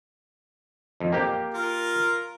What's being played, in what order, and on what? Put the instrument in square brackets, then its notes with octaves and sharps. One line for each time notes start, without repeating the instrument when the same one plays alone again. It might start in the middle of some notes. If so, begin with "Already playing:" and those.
[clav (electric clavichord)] F2
A#3 G4
[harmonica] F4 A#4